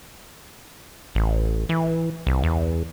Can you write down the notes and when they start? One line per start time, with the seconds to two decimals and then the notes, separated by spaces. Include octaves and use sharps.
1.15 A1
1.69 E3
2.27 C2
2.43 E2